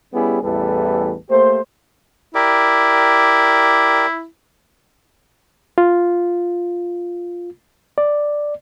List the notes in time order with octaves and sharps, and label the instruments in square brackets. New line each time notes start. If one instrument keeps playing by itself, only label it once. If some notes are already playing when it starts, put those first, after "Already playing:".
[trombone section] G3 B3 C#4 E4 G4 G#4
A1 E2 E3 G3 A4 B4
A3 A#3 G4 C5
[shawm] E4 [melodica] G4 A#4 D5
[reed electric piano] F4
D5